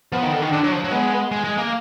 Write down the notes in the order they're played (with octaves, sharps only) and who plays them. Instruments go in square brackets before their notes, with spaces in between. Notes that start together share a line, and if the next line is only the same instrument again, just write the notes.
[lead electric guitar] F3 [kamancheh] B3
[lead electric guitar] D#3
D3
D#3
[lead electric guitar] D3 [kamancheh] D4
[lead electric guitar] F#3
F3
F#3
[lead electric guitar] G#3 [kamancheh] B3
[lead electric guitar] G#3
G#3
A#3